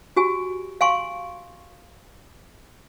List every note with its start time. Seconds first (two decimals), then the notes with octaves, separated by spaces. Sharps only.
0.16 F#4 G4 G#5
0.81 F5 G#5 C6 C#6